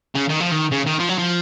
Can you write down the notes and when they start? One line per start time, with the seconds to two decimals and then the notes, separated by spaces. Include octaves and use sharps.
0.15 C#3
0.29 D#3
0.40 F3
0.51 D#3
0.71 C#3
0.86 D#3
0.99 F3
1.09 F#3
1.18 F3